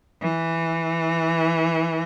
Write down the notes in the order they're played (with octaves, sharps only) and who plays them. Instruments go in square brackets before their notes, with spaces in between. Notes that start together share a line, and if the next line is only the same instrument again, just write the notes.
[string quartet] E3